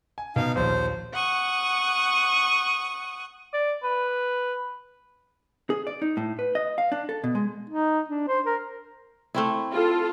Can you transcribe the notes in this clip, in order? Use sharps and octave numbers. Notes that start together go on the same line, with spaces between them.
G#5
B2 D#4 F5
A#1 D#2 C5
F#5 C#6 D#6
D5
B4
G#4
D5
D#4
A2
B4
D#5
F5
D4
A4
B2
G#3
D#4
D4
C5
A#4
A3 C4 E4
F4 A4